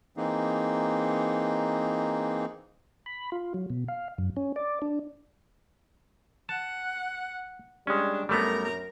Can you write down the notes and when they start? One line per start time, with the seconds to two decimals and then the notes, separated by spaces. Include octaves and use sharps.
0.17 E3 A#3 C4 D#4 G#4
3.06 B5
3.32 F4
3.54 F#3
3.70 B2
3.88 F5
4.18 F#2
4.37 C#4
4.56 D5
4.82 D4
6.49 F#5 A5
7.87 G3 G#3 C#4 D4
8.29 F#2 G3 A3 B3 A#4 A#5